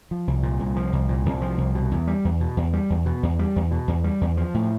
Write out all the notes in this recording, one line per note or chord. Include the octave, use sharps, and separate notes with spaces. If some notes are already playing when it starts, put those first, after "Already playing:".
F3
C2
A#2
C2
F3
C2
A#2
C2
F3
C2
B2
E2
G3
E2
B2
E2
G3
E2
B2
E2
G3
E2
B2
E2
G3
E2
F3
A2